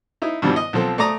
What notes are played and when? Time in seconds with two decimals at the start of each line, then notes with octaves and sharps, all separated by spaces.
0.22 D#4 E4
0.42 G2 B2 E3 F3 G3
0.56 D#5
0.73 B1 F3 C4 A4
0.98 A3 D5 A#5 D#6